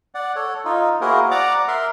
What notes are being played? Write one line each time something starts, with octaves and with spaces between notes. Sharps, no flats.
D5 F#5
A4 C#5
D#4 F4
A#3 E4 F#4 G#4 A#4 C5
D5 F#5 A#5 D6
A#4 E5 C6